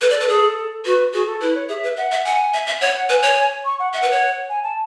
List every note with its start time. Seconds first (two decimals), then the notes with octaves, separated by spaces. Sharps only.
0.01 A4 B4
0.10 D5
0.15 A4
0.20 B4
0.28 G#4 A4
0.85 F#4 B4
1.13 F#4 G#4
1.26 A4
1.41 E4 B4
1.55 C#5
1.69 G#4 E5
1.83 B4
1.97 E5 F#5
2.12 E5
2.24 F#5 G#5
2.54 E5
2.67 E5
2.80 C#5 F#5
2.96 F#5
3.09 B4 G#5
3.23 C#5
3.65 C#6
3.79 F#5
3.93 E5 F#5
4.02 B4
4.11 C#5
4.49 G#5
4.63 A5